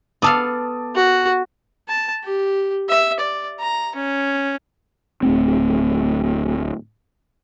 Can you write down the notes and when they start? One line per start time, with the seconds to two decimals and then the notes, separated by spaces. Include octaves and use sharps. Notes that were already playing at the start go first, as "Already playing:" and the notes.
0.22 B3 A4 F5 A5 D6 D#6
0.95 F#4
1.88 A5
2.24 G4
2.89 E5
3.19 D5
3.60 A#5
3.95 C#4
5.23 D1 A3 C4